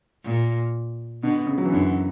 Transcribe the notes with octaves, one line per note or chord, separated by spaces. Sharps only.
A#2
B2 D3
C#3
F#3
E3
F#2 D3